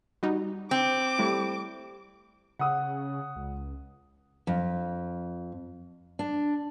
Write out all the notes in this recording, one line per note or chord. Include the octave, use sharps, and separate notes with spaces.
G3 D#4 F#4
C4 D6
G3 A3 E4
C#3 F#5 D#6
C#2
F2
D4